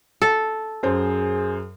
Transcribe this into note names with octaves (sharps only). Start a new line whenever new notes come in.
A4
F#2 G#4 C5